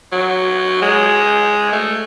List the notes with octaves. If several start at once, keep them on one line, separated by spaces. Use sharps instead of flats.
F#3
G#3
A3